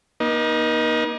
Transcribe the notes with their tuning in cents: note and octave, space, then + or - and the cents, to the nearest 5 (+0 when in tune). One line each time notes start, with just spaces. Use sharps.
A#3 +45 D#4 +0